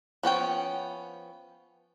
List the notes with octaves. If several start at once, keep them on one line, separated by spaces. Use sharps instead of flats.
F3 B3 C#4 G5